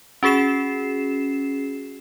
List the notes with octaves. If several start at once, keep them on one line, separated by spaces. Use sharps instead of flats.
C#4 F#4 G#4 C7 E7